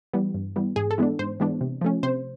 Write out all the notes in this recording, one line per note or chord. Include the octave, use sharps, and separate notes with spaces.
E3 G3 B3
G2
E3 G3 B3
G#2 G#4
A4
E3 G#3 B3 D4
G#2 C5
E3 G#3 B3 D4
C3
F3 A3 C#4
C3 C5